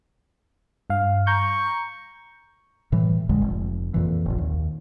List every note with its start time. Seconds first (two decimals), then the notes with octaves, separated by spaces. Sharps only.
0.90 G2 F5
1.27 A#5 C#6 G6
2.92 A2 E3 G3
3.29 A1 F2 D3 G#3
3.42 F1
3.94 F2 A#2 E3
4.26 F1 A#1
4.38 D#2